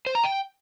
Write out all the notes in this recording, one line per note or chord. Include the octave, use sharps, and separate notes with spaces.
C5
A#5
G5